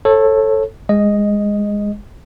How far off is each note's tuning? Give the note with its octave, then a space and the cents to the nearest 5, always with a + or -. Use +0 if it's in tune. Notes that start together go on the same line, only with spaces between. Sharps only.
A4 +5 C#5 -30
G#3 -15 D#5 +0